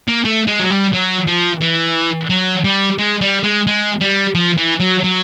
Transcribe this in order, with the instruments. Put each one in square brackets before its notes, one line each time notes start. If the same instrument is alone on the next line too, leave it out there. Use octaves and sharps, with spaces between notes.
[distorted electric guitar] A#3
A3
G#3
F#3
G3
F#3
F3
E3
F#3
G3
G#3
G3
G#3
G#3
G3
F3
E3
F#3
F#3